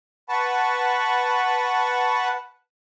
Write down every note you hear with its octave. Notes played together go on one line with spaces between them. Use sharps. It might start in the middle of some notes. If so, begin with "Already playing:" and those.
B4 F#5 A5 B5 C#6